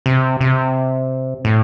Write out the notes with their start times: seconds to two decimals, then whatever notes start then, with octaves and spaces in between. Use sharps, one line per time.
0.06 C3
0.41 C3
1.45 A2